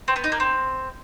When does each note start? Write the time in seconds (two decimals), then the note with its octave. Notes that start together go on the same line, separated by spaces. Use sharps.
0.08 C4
0.16 B3
0.24 D#4
0.32 A#3
0.40 C4